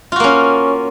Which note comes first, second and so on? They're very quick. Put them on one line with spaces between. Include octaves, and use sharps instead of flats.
F4 F#4 A#3 C#4